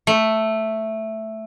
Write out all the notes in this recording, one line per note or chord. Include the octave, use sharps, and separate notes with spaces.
A3